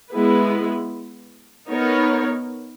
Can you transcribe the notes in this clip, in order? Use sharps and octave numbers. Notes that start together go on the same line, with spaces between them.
G#3 B3 E4 B4
B3 D#4 A#4 C#5